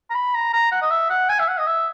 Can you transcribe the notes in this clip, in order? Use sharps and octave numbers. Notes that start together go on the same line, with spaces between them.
A#5
B5
A#5
A#5
F#5
D#5
E5
F#5
G#5
E5
F#5
D#5
E5